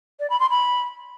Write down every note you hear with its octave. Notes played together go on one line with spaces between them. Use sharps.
D5
B5
C6
B5